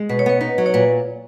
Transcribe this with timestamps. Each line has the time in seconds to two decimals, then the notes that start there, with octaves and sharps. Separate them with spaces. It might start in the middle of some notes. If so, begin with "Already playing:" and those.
Already playing: G#3
0.09 B2 B4
0.19 C#5
0.26 B3 B4
0.41 D#4 B4
0.58 F#3
0.66 C#5
0.74 A#2 B4